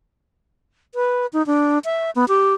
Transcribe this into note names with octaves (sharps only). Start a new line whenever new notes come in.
B4
D#4
D4
E5
B3
G4